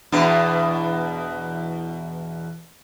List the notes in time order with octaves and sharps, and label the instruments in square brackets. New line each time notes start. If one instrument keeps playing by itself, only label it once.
[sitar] E2 B2 D4